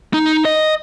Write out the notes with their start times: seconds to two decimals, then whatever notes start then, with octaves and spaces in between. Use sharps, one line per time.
0.14 D#4
0.45 D#5